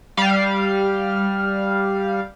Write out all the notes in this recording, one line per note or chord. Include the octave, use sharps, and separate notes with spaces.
G3 F5